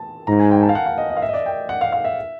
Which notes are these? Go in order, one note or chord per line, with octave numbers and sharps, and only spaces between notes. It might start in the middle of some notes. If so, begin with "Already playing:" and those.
Already playing: A5
G#2 A#5
G#5
G5
A5
F5
F#5
F5
D#5
D#5
F5
E5
D#5
D5
G5
F#5
F5
F5
E5